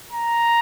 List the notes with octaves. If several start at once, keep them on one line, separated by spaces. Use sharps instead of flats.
A#5